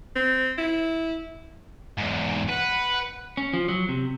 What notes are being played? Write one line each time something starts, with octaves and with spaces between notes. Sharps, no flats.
C4
E4
E2 G#2
B4 F#5
C#4
F3
F#3
C3